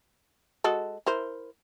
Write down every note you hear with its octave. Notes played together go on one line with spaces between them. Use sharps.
G#3 F#4 A4
E4 A#4 C5